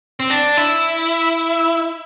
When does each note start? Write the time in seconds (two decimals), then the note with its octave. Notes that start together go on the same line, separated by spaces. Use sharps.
0.20 C4
0.30 D4
0.57 E4